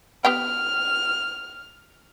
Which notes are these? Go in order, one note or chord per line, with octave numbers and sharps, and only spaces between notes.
B3 G4 G5 F6